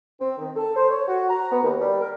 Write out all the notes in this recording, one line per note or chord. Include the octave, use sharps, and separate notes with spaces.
C4
D#3
A4
C5
C#5
F#4
A#5
B3
D#2
G3
A#4